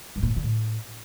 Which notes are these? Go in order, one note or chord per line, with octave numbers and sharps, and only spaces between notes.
G2
A#2
A2
D3
A2